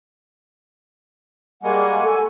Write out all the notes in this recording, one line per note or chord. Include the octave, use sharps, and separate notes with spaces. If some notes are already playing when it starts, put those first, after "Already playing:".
G3 G#3 A#3 F#5 G#5 C#6
A4